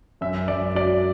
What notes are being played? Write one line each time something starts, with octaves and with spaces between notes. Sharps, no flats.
F#2 E5
F#2 D5
F#3 D5